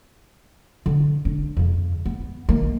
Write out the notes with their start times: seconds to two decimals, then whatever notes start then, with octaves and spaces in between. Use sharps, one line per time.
0.86 D3
1.25 D4
1.57 F2 C#3
2.06 B3
2.49 D#3 A#3